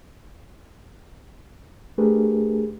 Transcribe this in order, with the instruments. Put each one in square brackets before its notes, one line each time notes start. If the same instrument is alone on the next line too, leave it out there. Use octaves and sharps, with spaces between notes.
[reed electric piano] A3 D4 G4 G#4 A#4 B4